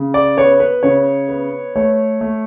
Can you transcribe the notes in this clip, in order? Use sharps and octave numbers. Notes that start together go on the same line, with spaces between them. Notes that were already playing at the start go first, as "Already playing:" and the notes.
Already playing: C#3
D5
B3 C#5
B4
C#3 C#5
B3
A3 C#5
A3